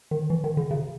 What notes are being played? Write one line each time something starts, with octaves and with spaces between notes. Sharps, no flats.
D#3
E3
D#3
D3
C#3